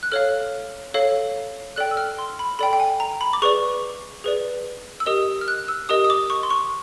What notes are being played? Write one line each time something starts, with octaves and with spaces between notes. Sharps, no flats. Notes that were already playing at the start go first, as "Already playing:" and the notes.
F#6
A4 C#5 F5 F6
A4 C#5 F5
A4 D5 G5 F#6
E6
F6
C6
B5
A4 D5 G5 B5
G5
G#5
A#5
B5
D6
G#4 B4 D5 C#6
G#4 B4 D5
E6
G4 A#4 D#5 D#6
F6
F#6
E6
G4 A#4 D#5 D#6
D#6
D6
C#6
C6
C#6